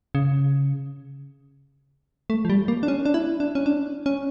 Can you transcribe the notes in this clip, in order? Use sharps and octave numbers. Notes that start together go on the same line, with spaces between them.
C#3
A3
F3
G3
A#3
D4
C#4
D4
E4
D4
C#4
D4
C#4